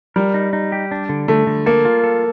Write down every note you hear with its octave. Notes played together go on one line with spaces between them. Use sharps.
G3 A#4
D#4
D#4
G4
D4
D3
D3 A3
D3
A#3 A4
F4
A4